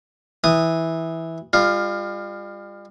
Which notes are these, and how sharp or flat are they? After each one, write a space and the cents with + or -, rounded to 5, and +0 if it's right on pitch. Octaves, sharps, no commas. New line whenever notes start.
E3 -10 D#6 -5
G3 +40 F4 +0